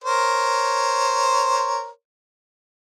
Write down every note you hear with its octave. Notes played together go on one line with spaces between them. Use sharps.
A#4 C5 C#5